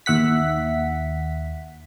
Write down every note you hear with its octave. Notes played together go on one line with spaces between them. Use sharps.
D#2 E5 F#5 B6